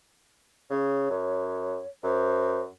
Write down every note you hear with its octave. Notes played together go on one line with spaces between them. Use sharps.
C#3 C#5
F#2
F#2 C5